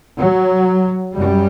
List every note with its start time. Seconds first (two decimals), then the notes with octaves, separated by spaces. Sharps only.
0.19 F#3
1.17 F#2 G3